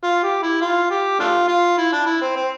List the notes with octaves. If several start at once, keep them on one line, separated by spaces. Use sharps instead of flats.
F4
G4
E4
F4
G4
A3 D4 F4
F4
E4
D4
E4
C4
C4